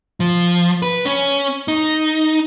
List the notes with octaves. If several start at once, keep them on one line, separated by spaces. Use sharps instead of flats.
F3
B4
C#4
D#4